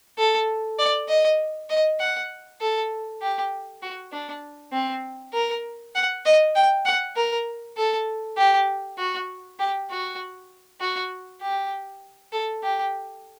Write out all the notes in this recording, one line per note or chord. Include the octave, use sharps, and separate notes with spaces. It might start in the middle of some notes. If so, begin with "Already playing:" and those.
A4
D5
D#5
D#5
F#5
A4
G4
F#4
D4
C4
A#4
F#5
D#5
G5
F#5
A#4
A4
G4
F#4
G4
F#4
F#4
G4
A4
G4